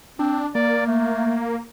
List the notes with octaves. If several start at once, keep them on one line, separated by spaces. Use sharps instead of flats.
C4 D4
A#3 D5
A3